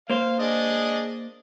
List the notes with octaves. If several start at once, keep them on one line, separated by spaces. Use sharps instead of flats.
A#3 C5 F5
D4 G#4 D#5